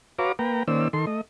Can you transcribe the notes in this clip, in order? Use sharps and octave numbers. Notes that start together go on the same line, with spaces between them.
F#4 B4 C#5 F5 A#5 D6
A#3 B4 G5 A#5
D#3 A#3 C#4 C5 D5 E6
D#3 A4 C6
A3 D#5